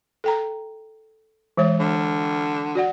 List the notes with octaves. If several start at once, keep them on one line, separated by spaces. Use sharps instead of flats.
A4 G5 A#5
E3 G#3 C#5
D3
F#4 D5 F#5